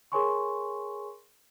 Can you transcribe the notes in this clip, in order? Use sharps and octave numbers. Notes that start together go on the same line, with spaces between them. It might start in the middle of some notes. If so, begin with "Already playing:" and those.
G#4 A#4 C#5 G#5 C6 C#6